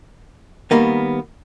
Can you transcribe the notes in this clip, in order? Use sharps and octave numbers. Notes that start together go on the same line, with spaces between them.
D#3 G3 A#3 B3